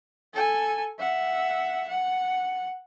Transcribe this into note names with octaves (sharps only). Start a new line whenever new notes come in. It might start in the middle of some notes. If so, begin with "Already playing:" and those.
A4 G#5
E5 F#5
F#5